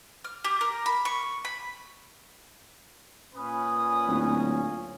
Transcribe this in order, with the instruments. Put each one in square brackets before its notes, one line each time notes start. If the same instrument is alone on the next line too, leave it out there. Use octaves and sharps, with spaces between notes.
[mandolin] F6
G4
A#4
B5
C#6
B5
[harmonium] A#2 C#4 [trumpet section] B4 D#6
[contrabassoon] D1